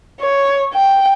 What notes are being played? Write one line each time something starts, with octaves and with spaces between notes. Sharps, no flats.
C#5
G5